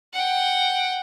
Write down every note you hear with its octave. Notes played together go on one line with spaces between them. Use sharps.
F#5 G5